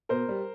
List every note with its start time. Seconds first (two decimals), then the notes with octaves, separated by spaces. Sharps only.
0.09 B2 A#4 C5
0.29 G3